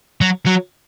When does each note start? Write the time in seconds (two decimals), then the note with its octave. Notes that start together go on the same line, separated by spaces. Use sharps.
0.21 F#3
0.46 F#3